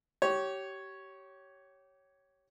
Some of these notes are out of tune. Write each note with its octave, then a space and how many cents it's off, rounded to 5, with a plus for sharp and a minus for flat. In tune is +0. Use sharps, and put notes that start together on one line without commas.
G4 -25 C#5 +0